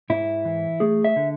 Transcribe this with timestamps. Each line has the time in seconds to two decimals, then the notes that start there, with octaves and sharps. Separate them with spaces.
0.10 G#2 E4
0.45 E3
0.80 A3 G#4
1.04 E5
1.16 D3